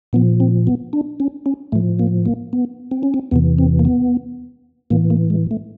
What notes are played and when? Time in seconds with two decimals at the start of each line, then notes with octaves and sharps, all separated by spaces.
0.13 A#2 F3 B3
0.40 C4
0.67 B3
0.93 D4
1.20 C#4
1.46 C#4
1.72 A2 F3 A3
1.99 A#3
2.26 A#3
2.53 B3
2.91 C4
3.03 C#4
3.14 C4
3.31 E2 C3 E3 B3
3.58 C4
3.79 A#3
3.85 B3
4.90 A2 E3 A#3
5.10 A#3
5.30 G#3
5.51 A3